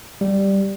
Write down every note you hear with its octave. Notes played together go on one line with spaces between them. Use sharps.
G3